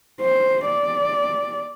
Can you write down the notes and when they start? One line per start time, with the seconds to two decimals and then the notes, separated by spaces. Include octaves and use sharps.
0.21 C5
0.65 D5